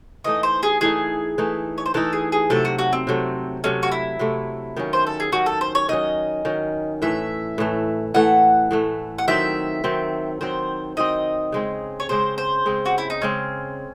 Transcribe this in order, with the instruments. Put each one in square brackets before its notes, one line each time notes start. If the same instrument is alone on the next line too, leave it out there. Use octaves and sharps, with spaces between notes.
[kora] E3 A3 D#4 [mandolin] D#5
[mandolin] C5
G#4
[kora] E3 A3 D#4 [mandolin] G#4
[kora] E3 A3 D#4
[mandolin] C#5
C5
[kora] E3 A3 D#4 [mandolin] A4
[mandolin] G#4
G#4
[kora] C3 F#3 A3 [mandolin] A4
[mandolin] F#4
F#4
C4
[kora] C3 F#3 A3
[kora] C3 F#3 A3 [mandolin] C#4
[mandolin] F#4
E4
[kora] C3 F#3 A3
D#3 F#3 C#4
[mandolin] C5
A4
G#4
[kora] D#3 F#3 C#4 [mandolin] F#4
[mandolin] A4
C5
C#5
[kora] D#3 F#3 C#4 [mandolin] D#5
[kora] D#3 F#3 C#4
[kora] A2 E3 A3 [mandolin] E5
[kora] A2 E3 A3
[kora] A2 E3 A3 [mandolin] F#5
[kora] A2 E3 A3
[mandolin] F#5
[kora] D#3 F#3 C4 [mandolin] E5
[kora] D#3 F#3 C4
[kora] D#3 F#3 C4 [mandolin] C5
[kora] D#3 F#3 C4 [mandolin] D#5
[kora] C#3 G#3 C4
[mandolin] C#5
[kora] C#3 G#3 C4 [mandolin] C5
[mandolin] C5
[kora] C#3 G#3 C4
[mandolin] F#4
E4
D#4
[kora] C#3 G#3 C4 [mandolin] C#4